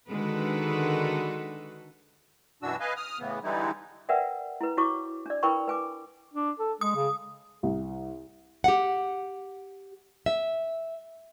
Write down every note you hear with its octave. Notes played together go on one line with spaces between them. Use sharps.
D3 D#3 G#3 F#4 A4 B4
F#2 B2 E3 D4 F#4 E6
B4 D#5 F5 G#5
D#6 F6
A2 C#3 E3 B3
D3 E3 G3 G#3 D#4 E4
A#4 B4 D5 E5 F#5 G5
E4 B4
E4 F#4 C#5 C#6 D6
D4 D5
E4 A#4 B4 G5 B5 C#6
B4 G#5 D6
D4
A4
G#3 D#6
C#3
C2
G4 F#5
E5